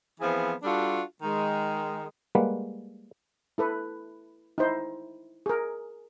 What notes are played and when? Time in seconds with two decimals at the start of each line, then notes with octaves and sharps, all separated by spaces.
0.20 E3 F3 B3 C4 G#4
0.63 G3 D4 F4 F#4 A4
1.22 D#3 G#3
2.35 G3 G#3 A#3 B4 F#5
3.58 E4 A4 B4
4.58 D#4 E4 C5
5.46 G#4 A#4